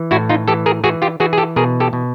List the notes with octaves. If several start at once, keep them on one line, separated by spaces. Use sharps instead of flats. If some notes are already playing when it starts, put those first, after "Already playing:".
Already playing: E3
A2 E4 F#4
D#4 F4
E3 G4 A4
G#4 A#4
E3 F#4 G#4
F4 G4
E3 F#4 G#4
G#4
G4 A4
B2 G#4 A#4
G4 A4
B2